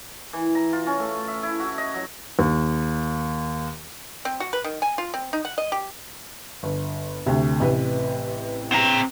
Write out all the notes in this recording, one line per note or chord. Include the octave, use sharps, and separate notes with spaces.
E3
A#5
F4
C#4
A3
E5
E4
F#4
D#5
F#3
D#2
C4
F#4
B4
D#3
G#5
F4
C4
D#4
F#5
D#5
G4
G1
D2 C3
A1 C3 B4
C4 A#5